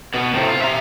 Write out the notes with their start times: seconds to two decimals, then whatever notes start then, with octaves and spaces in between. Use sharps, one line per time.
0.14 B2 B3
0.34 A2 C3
0.49 F4
0.62 E5 A#5